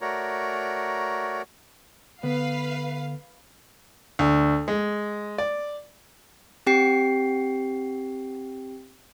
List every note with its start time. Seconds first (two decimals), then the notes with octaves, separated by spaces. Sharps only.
0.01 A3 F#4 A#4 C#5 D5 A#5
2.23 D3 B3 B4 F5
4.19 D2
4.68 G#3
5.38 D5
6.66 C4 G4 G5 C7